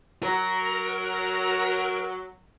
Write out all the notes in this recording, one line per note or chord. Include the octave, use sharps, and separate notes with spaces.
F#3 A#4